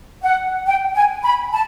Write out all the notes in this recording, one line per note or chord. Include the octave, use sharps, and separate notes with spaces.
F#5
G5
G#5
B5
A5